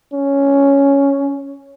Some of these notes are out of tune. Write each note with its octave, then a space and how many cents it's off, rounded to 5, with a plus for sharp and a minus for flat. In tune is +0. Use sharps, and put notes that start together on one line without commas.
C#4 +5